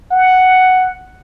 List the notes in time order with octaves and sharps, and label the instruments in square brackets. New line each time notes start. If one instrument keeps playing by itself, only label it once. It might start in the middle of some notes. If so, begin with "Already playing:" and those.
[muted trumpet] F#5